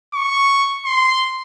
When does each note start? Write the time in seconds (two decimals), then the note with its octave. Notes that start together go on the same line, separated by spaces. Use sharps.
0.14 C#6
0.85 C6